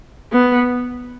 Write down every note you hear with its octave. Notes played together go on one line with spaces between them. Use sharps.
B3